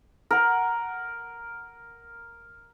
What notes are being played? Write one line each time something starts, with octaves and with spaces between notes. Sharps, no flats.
A#4 F#5